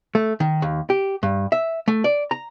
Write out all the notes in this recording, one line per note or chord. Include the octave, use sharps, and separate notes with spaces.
A3
D#3
D#2
G4
G2
E5
A3
D5
A#5